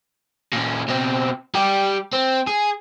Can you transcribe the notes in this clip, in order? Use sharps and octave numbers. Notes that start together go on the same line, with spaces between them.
A#2 C#4
B2 C4
G3 G4
C4
G#4